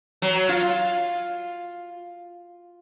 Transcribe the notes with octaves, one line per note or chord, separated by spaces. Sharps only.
F#3
F4